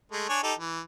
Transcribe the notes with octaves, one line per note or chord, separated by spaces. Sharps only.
G#3 A3
D4 C#5 G#5
D#4 G4 A4
E3